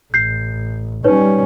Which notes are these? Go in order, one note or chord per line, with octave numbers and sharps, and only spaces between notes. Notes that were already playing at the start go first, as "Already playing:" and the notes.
A1 G6 C7
G3 C#4 D#4 B4 C#5